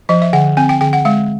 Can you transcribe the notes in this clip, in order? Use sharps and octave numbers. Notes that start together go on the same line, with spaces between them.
F3 D#5
E5
D3 F#5
C4 G#5
G5
D3 G5
F#5
G#3 F5